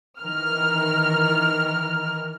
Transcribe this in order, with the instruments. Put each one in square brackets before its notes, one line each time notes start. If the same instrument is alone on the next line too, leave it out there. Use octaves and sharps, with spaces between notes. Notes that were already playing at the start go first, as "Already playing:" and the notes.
[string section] D#3 E3 A#4 F6